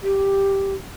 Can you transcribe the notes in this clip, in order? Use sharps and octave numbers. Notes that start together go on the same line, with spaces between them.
G4